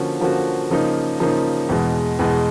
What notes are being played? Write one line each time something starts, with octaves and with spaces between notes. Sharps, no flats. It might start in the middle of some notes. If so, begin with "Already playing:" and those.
Already playing: D3 F3 A#3 C#4 F#4
D3 F3 A#3 C#4 F#4
C#3 F3 A#3 D#4
C#3 F3 A#3 D#4
E2 B2 G#3
E2 B2 G#3